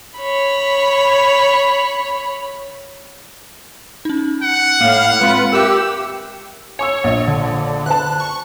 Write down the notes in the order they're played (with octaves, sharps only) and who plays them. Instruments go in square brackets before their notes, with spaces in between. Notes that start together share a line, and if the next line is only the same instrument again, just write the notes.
[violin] C#5 B5
[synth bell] C#4 D#4
[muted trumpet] F#5
[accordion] A2 F5 [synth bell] A#3
[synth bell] G#3 C4 [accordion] F4 B4
[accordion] G4 E6 [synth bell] A#4 E5
[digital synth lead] C#5 [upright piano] G#5 C#6 E6
[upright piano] A#1 D#5
[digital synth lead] D3
[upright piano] B4 C5 A5 [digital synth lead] F#6
[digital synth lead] C#6